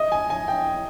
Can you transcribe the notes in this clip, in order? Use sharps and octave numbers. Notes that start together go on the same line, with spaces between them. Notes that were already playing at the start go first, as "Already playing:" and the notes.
Already playing: D#5
G#5
G#5
G5